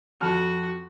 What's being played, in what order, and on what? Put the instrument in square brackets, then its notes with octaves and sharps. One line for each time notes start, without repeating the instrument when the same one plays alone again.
[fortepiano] F2 A5 F6 [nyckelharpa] F#4